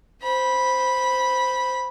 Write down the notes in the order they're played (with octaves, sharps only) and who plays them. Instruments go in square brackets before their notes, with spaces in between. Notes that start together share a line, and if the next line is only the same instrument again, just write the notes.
[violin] C5 B5